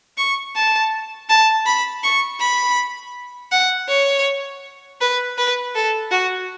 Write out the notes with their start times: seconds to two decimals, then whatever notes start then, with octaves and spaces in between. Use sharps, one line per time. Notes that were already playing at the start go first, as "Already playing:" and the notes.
0.18 C#6
0.56 A5
1.29 A5
1.66 B5
2.03 C#6
2.40 B5
3.52 F#5
3.89 C#5
5.01 B4
5.38 B4
5.75 A4
6.11 F#4